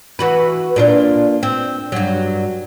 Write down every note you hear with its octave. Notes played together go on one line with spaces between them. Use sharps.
E3 F#4 B4
A#2 D4 F4
C4
G2 F#3